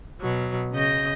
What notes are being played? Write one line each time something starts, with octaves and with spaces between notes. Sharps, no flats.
B2 F#3
C#3 D#5 G6 A#6